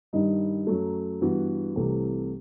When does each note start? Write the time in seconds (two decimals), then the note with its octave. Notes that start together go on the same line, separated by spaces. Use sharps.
0.13 G2 D#3 G3 D#4
0.67 F#2 F#3 A3
1.21 G2 E3 B3 F#4
1.76 C2 C3 E3 A3 C4